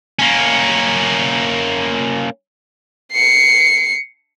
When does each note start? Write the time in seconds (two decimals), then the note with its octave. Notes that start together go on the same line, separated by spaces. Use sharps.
0.19 A#3 C#4
3.12 C7 C#7